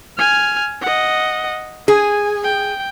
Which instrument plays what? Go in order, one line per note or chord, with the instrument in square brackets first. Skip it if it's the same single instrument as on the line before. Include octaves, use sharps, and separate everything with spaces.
[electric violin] G#5 F6
D#5 F#5
[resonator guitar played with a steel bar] G#4 [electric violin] G#5
[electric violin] G5